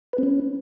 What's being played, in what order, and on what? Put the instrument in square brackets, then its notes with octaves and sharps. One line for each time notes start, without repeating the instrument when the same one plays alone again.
[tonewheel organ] B4
C4
C#4